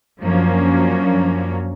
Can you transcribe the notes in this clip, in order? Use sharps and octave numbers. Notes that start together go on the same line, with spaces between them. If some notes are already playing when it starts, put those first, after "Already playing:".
F#2 F3 F#3 A#3 C#4 D4